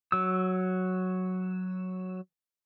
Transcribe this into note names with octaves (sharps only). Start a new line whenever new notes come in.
F#3 E6